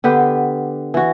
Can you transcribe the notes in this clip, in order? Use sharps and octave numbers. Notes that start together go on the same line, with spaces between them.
D3 B3 G4 B4
E3 F#4